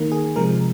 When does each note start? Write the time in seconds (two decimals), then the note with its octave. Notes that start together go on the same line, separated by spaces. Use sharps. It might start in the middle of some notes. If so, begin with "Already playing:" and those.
Already playing: D#3 A#3
0.12 G#4
0.36 C3 F3 G#3 A#4